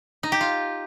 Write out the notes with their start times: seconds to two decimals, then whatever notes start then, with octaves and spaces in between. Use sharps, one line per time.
0.23 D#4
0.32 G4
0.41 F4